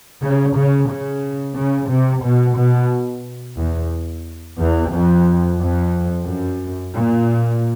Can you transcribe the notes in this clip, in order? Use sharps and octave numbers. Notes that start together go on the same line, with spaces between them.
C#3
C#3
C#3
C#3
C3
B2
B2
E2
E2
F2
F2
F#2
A#2